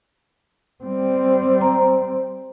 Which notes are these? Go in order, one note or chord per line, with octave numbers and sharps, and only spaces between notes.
G3 C4
C5 A#5